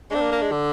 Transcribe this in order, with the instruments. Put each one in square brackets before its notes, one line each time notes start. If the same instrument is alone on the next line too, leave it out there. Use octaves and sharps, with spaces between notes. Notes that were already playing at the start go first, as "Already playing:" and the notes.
[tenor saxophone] G#3 C4 [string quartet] D4
[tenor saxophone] A#3
A#3
G#3
D3